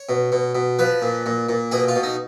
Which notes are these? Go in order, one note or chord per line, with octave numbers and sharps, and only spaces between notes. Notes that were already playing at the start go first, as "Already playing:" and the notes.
Already playing: C#5
B2
B2
B2
F3 B4
A#2
A#2
A#2
B2 G#4
F4
B2
D#4